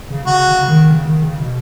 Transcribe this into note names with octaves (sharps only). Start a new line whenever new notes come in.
C#3
C#3 F#4
C#3
D#3
C#3
D#3
C#3
B2